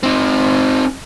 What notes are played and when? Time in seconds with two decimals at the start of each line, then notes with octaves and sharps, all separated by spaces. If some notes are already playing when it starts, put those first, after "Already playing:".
0.03 C4 D#4